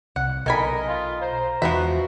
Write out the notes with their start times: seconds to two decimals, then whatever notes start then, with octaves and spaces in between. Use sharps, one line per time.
0.16 C2 F#5
0.46 B1 A4 A#4 D#5 G#5 B5
0.88 F4
1.22 C5 A#5
1.62 E1 E3 F3 B3 F#4 E5